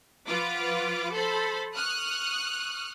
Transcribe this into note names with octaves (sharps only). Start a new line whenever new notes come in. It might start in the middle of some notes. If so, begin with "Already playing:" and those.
F3 F4 B4 F#5 D6
A4 C5 B5
C#6 D#6 F6 F#6